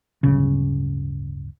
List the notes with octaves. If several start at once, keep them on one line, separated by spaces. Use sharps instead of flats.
D1 G1 C#3